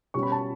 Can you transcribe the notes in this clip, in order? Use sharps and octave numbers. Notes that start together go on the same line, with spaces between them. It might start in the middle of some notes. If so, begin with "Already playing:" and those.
B2 G3 C#4 C#6
B5
A5